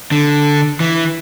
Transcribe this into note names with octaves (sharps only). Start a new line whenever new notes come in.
D3
E3